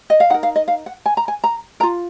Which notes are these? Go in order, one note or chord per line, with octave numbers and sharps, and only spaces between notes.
D#5
F5
D#4 A#4 F#5
F5
D#5
F5
F#5
G#5
A#5
G#5
A#5
A#4 A#5
F4